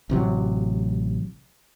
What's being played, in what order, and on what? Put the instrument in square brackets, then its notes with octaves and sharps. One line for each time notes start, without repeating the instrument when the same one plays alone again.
[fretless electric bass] A1 C3 F#3